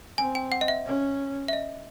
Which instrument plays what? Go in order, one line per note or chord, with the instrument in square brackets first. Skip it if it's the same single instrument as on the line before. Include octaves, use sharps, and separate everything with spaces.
[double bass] C4 [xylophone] G#5
[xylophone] G5
F#5
D#5
E5
[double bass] C#4
[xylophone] E5
D#5